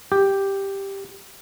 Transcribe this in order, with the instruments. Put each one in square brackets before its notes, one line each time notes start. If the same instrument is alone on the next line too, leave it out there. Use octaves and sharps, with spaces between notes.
[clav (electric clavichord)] G4